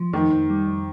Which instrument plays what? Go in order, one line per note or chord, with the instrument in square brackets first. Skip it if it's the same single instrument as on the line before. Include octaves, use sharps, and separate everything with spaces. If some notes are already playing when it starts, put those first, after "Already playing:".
Already playing: [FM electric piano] F3
[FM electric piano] F2 [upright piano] D#3
[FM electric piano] F2
G3
F2